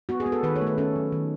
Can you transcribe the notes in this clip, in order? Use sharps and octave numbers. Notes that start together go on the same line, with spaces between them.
B3 F#4
G#4
B3
A4
D#3 B4
C#5
A3
B4
C#4 A4
F#3
D#3